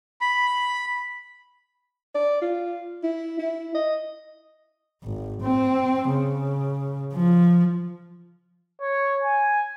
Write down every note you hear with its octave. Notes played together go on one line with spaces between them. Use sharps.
B5
D5
F4
E4
E4
D#5
G#1
C4
C#3
F3
C#5
G#5